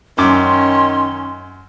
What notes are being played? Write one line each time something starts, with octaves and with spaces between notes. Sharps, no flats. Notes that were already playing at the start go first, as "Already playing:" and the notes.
F#2 D#3 C#4 C6 D6